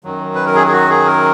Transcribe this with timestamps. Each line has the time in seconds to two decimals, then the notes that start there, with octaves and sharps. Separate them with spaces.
0.04 F#2 D#3 F#3
0.35 B4
0.46 A#4
0.55 G#4
0.67 G#4
0.73 F#4
0.90 G#4
1.06 A#4